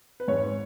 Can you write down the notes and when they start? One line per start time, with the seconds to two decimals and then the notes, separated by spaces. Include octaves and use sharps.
0.20 B4
0.28 G#2 C#5